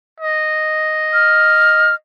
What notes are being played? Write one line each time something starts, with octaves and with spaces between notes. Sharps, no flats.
D#5
F6